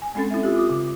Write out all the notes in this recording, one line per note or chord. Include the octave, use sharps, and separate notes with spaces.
G#5
G#3 C4 C#4 A4 A6
E4 E5
F4 G4
D6 D#6
C#3